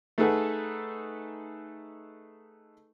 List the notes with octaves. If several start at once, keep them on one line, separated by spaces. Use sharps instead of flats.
A3 D#4 G#4 A4 B4 F#5